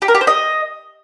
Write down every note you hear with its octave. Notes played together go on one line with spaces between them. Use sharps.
G4
A#4
G4
C5
D#5